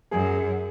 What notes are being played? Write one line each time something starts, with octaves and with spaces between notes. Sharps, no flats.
F#2 G#4